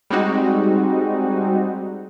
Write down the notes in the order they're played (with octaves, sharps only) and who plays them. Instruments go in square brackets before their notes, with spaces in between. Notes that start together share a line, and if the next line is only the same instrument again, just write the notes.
[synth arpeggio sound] G3 G#3 C4 D#4 F#4